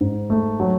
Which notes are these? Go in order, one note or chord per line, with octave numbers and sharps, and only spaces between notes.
G#2
A3
F#3